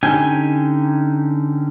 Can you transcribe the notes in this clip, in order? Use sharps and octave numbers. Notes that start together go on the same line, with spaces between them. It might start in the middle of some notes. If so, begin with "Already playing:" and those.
D3 C#4 D#4 G4 G#5